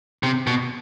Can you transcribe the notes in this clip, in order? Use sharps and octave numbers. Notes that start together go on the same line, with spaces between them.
C3
B2